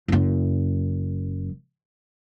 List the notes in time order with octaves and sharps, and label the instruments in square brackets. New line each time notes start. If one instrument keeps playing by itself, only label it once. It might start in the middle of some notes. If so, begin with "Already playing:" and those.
[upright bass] F#1 F#2